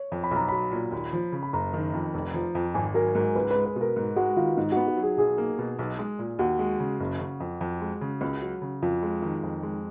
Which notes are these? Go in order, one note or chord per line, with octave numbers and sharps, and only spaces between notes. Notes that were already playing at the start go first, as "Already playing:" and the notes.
Already playing: C#5
F2
B5
B1 A#5
F#3 B5
A#2
D#2
F3
C#3
B5
F#1 A#5
D#3
F2
F1
F3
F2
G#1 G#5
F#3 A#4
G#2 A#4
C#2 B4
G#3 B4
B4
B2
A#4
G#2
G#3 F#4
D#3 F4
G#2 D#4
B3 F#4
F#4
F#3
G#4
B1 G#4
A#3
B2
B1
G#3
A#2
D#2 F#4
G#3
C#3
F#1
C#3
F2
F2
G#3
C#3
C#2
F#3
C#3
F2 F4
G#3
D#3
F2
G#3